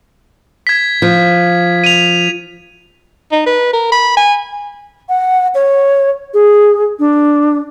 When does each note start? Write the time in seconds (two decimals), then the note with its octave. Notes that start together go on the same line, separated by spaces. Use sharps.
0.67 G#6 B6
1.02 F3
1.84 D#7 F7
3.32 D#4
3.46 B4
3.73 A#4
3.92 B5
4.17 G#5
5.09 F#5
5.55 C#5
6.34 G#4
6.99 D4